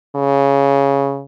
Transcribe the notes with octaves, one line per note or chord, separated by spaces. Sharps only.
C#3